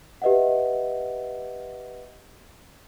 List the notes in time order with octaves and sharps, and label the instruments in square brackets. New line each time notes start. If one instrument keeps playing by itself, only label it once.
[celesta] G4 B4 D#5 E5 F#5